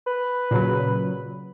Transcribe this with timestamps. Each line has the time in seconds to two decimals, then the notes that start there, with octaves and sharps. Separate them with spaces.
0.07 B4
0.51 A#2 C#3 F#3